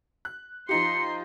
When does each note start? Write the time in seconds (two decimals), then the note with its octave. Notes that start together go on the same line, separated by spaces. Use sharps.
0.25 F#6
0.69 F3 D#4 G4 C6 C#7